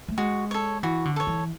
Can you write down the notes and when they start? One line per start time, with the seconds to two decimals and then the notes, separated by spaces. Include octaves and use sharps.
0.08 A3
0.18 G#3 F#4
0.51 A4 C#5
0.83 E3 F#4
1.05 D3
1.16 A4 C#5
1.27 E3